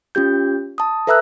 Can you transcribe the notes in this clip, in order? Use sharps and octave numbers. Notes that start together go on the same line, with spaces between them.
C#4 F4 G4 G6
A5 D#6
A4 B4 E5 A#5 E6 F#6